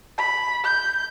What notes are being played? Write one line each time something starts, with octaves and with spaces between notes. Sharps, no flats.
B5
G6